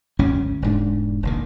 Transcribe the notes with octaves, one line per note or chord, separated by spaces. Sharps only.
G#1 D2 F#3 C#4
E1 G#2 D4
F1 A#1 D#3